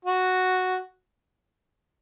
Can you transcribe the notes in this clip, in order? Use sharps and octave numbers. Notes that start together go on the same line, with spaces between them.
F#4